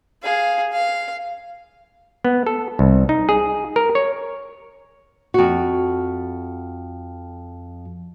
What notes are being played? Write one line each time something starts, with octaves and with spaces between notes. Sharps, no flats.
G#4 F5
F5
B3
A4
C2
D#4
G#4
A#4
C#5
F2 F#4